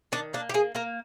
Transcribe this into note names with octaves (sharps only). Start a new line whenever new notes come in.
D#3 D4
A#3 D4
G4
A#3 G#4
A#3 A#4